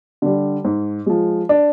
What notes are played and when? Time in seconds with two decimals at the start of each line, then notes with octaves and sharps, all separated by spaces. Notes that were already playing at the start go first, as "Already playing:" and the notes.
0.22 D3 G3
0.65 G#2
1.06 F3 G#3
1.49 D4